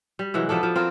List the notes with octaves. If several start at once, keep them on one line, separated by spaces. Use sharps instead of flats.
G3
C3 E3 F#3 G#3
F3 B3 D4 A4
F3
C4 F4 A#4